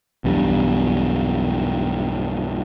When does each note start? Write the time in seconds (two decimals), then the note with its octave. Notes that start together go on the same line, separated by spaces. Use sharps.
0.24 B1 E2 G2 G3